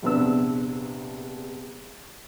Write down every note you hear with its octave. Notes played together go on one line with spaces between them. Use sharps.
A#1 E2 C3 B3 D4 E6